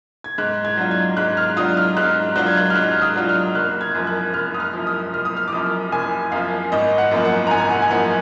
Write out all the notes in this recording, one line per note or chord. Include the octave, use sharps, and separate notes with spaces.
G#6
G#2 F#6
G#6
F#3 D4 F4
G#6
G#2 F#6
F6
F#3 D4 F4 D#6
F6
G#2 F#6
F#3 D4 F4 F#6
G#6
F#6
F6
G#2 F#6
D#6
F#3 D4 F4
F6
F#1 F#6
G#6
F#2 F3
F#6
F#1 F6
D#6
F6
F#2 F3
D#6
F#1 F6
D#6
F6
D6
F#2 F3 D#6
F#1 G#5
F#2 F3 F5
G#1 D#5
F#5
F#2 F3 A#3
F#5
A#5
G#1 G#5
F#5
G#5
F#2 F3 A#3 F#5